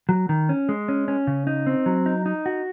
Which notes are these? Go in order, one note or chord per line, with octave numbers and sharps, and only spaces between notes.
F#3
D#3
C#4
G#3
C#4
C#4
C#3
D#4
C4
F#3
D#4
D#4
F#4